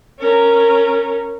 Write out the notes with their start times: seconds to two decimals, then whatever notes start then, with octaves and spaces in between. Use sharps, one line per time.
0.20 C#4 A#4